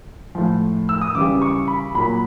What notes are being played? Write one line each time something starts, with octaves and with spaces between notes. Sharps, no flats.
A2 F3
E6
D#6
C#3 E3 G3 D6
C#6
B5
A#2 F#3 B5